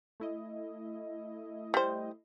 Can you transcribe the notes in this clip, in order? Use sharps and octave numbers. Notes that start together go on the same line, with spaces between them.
A3 E4 D#5
G3 C5